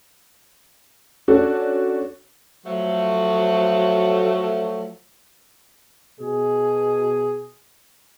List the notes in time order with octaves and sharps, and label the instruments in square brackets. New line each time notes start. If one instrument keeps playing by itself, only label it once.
[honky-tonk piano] C#4 D4 F#4 A4
[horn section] F3 F#3 A3
[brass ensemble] B2 G#4